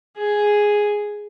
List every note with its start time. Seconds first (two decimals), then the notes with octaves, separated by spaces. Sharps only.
0.17 G#4